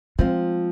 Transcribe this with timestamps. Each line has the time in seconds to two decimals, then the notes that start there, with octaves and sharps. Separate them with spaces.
0.19 F3 G#3 C4 F4